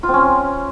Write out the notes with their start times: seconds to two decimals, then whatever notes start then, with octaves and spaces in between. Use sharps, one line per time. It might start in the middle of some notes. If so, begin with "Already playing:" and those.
0.03 F4
0.08 C4
0.14 C#4